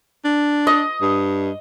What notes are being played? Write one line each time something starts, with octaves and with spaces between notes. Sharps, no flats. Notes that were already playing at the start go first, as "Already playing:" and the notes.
D4
D#5
G2